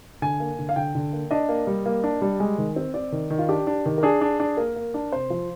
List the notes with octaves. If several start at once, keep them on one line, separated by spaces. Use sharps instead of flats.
D3 G#5
A#3
D3
F5
D3 G5
D3
A#3
D4 D#5
A#3
G3
A#3
D4
G3
G#3
D#3
C4
C4 D5
D#3
D#3
F4
D4 G4
D4
D#3
A#4
D4 G#4
D4
D4
A#3 A#4
A#3
D4
C3 C5
F3